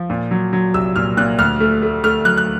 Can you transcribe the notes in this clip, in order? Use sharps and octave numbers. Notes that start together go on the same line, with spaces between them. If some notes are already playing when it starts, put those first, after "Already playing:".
Already playing: F3
A#2
F#3
F#3
C2 E6
A#2 F6
A#2 F#6
D2 F6
A3
A3
A3 F6
F#3 F#6
F#6